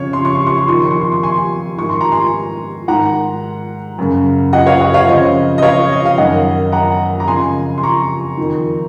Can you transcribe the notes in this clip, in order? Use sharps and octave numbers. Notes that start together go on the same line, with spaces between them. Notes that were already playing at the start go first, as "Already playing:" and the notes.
Already playing: F2 C#3 C#5
C6
C#6
C6
C#6
C6
F2 D#3 C#6
C6
C#6
C6
C#6
G#5 C6
G#2 D#3 C#6
C6
A#5
G#5 C6
G#2 D#3 F#5 A#5
F#2 C#3
D#5 F#5
C#5 F5
D#5 F#5
C#5 F5
F2 C#3 C5 D#5
D#5
C#5 F5
D#5
F5
F#2 D#3 D#5 F#5
F#5 A#5
A#5
F2 C#3 G#5 C6
C6
A#5 C#6
F2 D#3